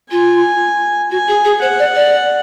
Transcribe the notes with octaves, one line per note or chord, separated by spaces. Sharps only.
F4 G#5
F#4 G#5
G#4
G#4
C5 F#5
D5
D5